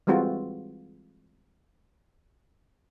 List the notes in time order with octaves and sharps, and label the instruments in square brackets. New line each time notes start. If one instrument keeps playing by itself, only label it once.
[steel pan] E3 G3 G#3 C4 F4 F#4